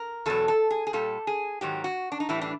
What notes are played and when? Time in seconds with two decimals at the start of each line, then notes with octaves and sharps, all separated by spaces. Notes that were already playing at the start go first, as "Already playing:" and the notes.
Already playing: A#4
0.26 E2 B2 F#3 A4
0.48 A4
0.71 G#4
0.87 G#4
0.93 A#2 G3 A4
1.27 G#4
1.61 G#2 D#3 F#3 G4
1.84 F#4
2.12 D4
2.20 D#4
2.29 A2 E3 G3 E4
2.42 D4